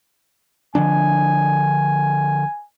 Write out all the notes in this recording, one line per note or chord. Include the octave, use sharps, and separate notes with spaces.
D3 F3 D4 G#5